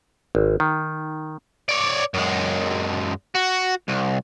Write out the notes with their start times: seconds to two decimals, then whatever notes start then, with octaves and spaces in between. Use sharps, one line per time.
0.35 G#1
0.60 D#3
1.69 C#5 D5
2.14 F#2 G#3
3.35 F#4
3.88 C2